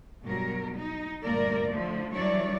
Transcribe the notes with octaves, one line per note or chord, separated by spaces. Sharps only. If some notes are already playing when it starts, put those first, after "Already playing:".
G2 B2 F#3 A#4
D#4
D2 G2 A#2 A#3 A#4 D5
A2 D3 F3 A3
E3 F#3 G3 D4 C#5 D5